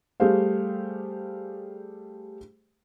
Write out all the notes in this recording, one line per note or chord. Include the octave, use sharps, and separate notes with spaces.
G3 A3 G4 G#4 C5 F5